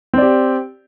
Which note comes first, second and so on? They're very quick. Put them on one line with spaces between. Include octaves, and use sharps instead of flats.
C4 D5 G4